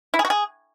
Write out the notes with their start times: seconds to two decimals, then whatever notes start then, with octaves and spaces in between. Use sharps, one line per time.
0.14 E4
0.19 G#4
0.25 F#4
0.30 G#4